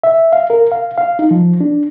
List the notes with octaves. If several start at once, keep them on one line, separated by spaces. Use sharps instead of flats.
E5
F5
A#4
F5
F5
D#4
F3
D4